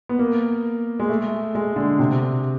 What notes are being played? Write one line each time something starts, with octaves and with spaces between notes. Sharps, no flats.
B3
A#3
G#3
A3
G#3
D3
C3